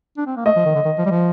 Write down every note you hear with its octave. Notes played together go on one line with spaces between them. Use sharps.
D4
C4
A#3
A3 D#5
F3
D#3
D3
D#3
F3
G3
F3